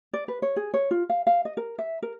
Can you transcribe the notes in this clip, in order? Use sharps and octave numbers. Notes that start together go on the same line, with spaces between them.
D5
B4
C#5
G#4
C#5
F4
F5
F5
D#5
A#4
E5
A#4